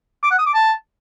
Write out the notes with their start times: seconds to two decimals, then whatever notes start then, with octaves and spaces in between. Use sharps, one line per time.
0.23 D6
0.31 F#5
0.39 D#6
0.46 D6
0.54 A5